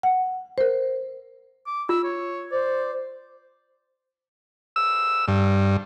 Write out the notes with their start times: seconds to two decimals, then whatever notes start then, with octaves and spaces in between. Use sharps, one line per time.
0.03 F#5
0.58 A#4 C5
1.67 D6
1.89 F4 E6
2.04 C#5
2.52 C5 D5
4.76 E6
5.28 G2